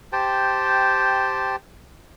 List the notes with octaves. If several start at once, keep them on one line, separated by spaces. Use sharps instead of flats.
G4 C5 G5 A5